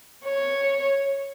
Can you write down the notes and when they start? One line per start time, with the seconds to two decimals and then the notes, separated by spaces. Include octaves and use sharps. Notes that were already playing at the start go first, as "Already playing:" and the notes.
0.25 C#5